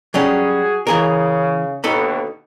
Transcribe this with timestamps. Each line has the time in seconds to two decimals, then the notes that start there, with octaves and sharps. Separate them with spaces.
0.14 F#3 G3 C#4 F#4 G#4
0.87 C#3 E3 G#4 A#4
1.84 D#2 B2 D3 D#4 A4 B5